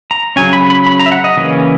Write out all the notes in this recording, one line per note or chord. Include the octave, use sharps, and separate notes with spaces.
A#5
C#3 F#3 C#4 G#5
B5
B5
B5
A#5
E5
F#5
D#5
C#3 E3 A#3 C#4